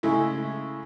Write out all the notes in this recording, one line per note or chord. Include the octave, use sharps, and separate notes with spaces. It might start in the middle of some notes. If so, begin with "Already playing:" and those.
C#3 G#3 A3 E4